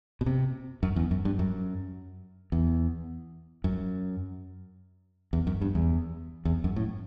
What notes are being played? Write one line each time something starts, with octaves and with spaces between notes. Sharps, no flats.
B2
C3
F#2
E2
F#2
G2
F#2
E2
F#2
E2
F#2
G2
E2
E2
F#2
A2